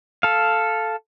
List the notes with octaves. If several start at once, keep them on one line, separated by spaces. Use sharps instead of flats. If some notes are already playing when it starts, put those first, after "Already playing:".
A4 F5